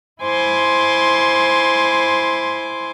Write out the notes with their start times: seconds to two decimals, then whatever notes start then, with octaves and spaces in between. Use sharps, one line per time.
0.22 E4 C5 G#5 C6 D6